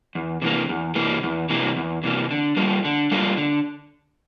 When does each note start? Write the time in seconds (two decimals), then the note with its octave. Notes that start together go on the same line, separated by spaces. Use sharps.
0.15 E2
0.42 C3 E3 A#3
0.69 E2
0.95 C3 E3 A#3
1.23 E2
1.50 C3 E3 A#3
1.76 E2
2.04 C3 E3 A#3
2.31 D3
2.57 G3 A#3 F4 A4
2.85 D3
3.11 G3 A#3 F4 A4
3.37 D3